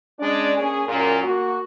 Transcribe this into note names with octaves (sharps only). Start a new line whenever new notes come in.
G#3 C#4 D4 D5
A#3 C#4 G#4
F#2 A#2
A#3 F#4